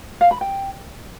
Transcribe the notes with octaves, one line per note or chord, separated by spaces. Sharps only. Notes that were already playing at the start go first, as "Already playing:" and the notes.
F5
B5
G5